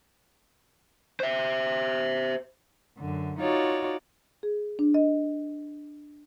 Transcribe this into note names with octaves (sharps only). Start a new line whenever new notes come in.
C5 E5
F#2 D3
D#4 F4 F#4 C#5 D5
G#4
D4
D#5